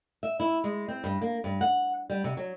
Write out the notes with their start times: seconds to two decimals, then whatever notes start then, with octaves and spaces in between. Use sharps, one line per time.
0.23 E5
0.40 E4
0.64 G#3
0.88 C4
1.04 G2
1.21 A#3
1.44 G2
1.61 F#5
2.10 G3
2.24 C3
2.37 F#3